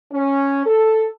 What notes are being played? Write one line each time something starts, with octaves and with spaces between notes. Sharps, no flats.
C#4
A4